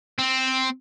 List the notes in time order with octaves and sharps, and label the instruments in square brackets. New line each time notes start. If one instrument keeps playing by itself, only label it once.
[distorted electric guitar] C4